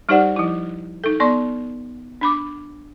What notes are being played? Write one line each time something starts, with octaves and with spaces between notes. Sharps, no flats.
G3 D#4 G4 C5 D5 F#5
F3 E4
D#4 A4
B3 D5 C6 C#6
D4 B5 D6